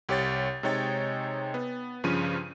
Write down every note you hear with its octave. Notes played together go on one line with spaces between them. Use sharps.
C2 G4 C#5 A6
C3 G#3 D#4 C#5 G5 A6
B3
G2 C#3 F3 C#4 D#7